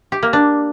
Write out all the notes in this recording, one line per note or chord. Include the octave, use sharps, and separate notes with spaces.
G4
A#3
D4